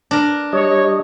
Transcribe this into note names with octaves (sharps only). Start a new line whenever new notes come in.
D4 A#4
G3 C#5 D#5